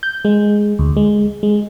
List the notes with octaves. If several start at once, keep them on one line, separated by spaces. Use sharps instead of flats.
G6
G#3
D2
G#3
G#3